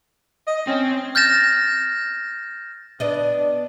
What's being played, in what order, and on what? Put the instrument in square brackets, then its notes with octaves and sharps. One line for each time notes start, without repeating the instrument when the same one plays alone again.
[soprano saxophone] D#5
[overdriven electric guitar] C4 [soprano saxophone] C#4
[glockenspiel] F6 G6 A6 A#6 E7
[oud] B3 D5 D#5 [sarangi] D4